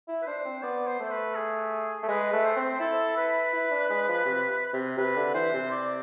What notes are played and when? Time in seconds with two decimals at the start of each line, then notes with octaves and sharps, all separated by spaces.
0.08 E4
0.22 B4
0.27 D4 C5
0.45 C4
0.63 B3 D5
0.87 C5
1.00 A3 C5
1.11 B4
1.36 G#4
2.03 A3
2.08 G#3 B4
2.33 A3
2.39 B4
2.44 C5
2.57 C4
2.80 E4 A4
3.17 B4
3.53 E4
3.71 D4
3.90 G#3
4.08 F3
4.25 C3
4.74 C3
4.98 C3 B4
5.16 D3
5.34 E3 C5
5.53 C3
5.71 D5